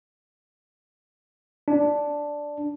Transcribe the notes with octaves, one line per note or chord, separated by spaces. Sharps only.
D4